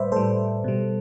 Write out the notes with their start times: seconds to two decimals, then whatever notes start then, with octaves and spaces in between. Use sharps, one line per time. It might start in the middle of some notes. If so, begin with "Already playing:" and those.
Already playing: A2 G3 B4 C5 D5 E5
0.12 A2 G3 A4 C5
0.64 B2 G3